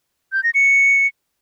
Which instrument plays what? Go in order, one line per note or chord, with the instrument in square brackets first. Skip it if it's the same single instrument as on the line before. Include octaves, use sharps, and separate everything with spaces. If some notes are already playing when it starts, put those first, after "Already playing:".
[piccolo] G6
A#6
C#7